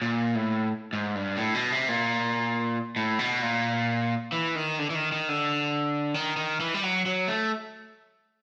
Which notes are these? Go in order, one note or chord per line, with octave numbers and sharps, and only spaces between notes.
A#2
A2
G#2
G2
A2
B2
C3
A#2
A2
B2
A#2
E3
D#3
D3
E3
D#3
D#3
D3
D#3
D#3
E3
G3
F#3
F#3
A3